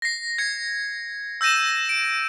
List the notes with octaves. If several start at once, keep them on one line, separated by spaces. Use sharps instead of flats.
A#6 C7
G#6 C#7
E6 G6 A#6 D#7 E7
D7